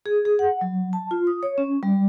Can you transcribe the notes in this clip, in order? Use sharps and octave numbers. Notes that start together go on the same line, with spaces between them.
G#4
G#4
F#5
F#3
A5
F4
D#6
C#5
C#4
G3